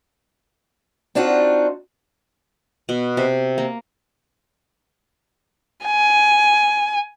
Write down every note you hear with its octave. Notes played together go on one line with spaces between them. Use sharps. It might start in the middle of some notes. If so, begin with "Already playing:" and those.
C4 D4 D#4 F4 F#4
B2
C3
A#3
G#5